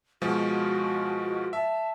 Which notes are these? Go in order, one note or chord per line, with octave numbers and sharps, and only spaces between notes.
B2 F3 G#3 F#4
E5 A5